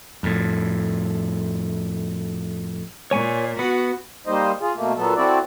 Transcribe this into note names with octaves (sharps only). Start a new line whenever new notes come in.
F2 A2
A#2 C#5 G#5 C#6
B3 F#4
G3 A#3 D#4 C5 D#5
F4 G#4
B2 A3 A#3
A#2 F#3 B3 A4
C4 E4 F#4 A4 D5